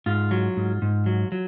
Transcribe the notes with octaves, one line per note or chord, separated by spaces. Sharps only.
G#2 F4
F#3
G#2
G#2
F#3
F#3